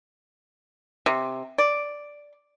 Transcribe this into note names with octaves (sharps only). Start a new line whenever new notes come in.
C3
D5